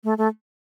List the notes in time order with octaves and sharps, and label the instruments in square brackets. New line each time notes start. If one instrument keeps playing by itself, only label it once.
[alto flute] A3
A3